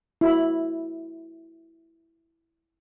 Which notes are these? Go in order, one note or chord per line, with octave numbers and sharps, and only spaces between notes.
E4 F#4 B5